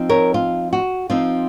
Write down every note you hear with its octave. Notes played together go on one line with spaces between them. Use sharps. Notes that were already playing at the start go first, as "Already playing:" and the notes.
Already playing: F3 C4 D#4
A#4 C#5
F4
F#4
F3 C4 D#4 F4